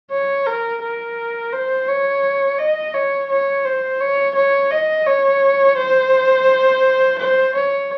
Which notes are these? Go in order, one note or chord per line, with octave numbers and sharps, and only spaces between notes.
C#5
A#4
A#4
C5
C#5
D#5
C#5
C#5
C5
C#5
C#5
D#5
C#5
C5
C5
C#5